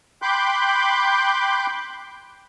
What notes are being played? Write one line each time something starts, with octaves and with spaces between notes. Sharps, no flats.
G5 B5 C6 D6 F#6 G6